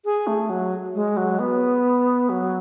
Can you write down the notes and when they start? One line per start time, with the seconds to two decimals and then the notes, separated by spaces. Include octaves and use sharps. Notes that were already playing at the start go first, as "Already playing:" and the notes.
0.05 G#4
0.27 A3
0.50 F#3
0.94 G#3
1.17 F#3
1.39 B3
2.29 F#3